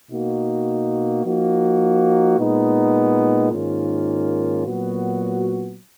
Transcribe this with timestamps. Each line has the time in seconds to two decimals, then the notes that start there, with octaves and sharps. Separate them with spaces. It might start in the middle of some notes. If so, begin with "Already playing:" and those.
0.11 B2 A#3 D#4 F#4
1.25 F3 A#3 D#4 F#4
2.38 A#2 G#3 B3 D#4
3.51 G#2 D#3 A#3 C#4 F4
4.66 A#2 F#3 B3 F#4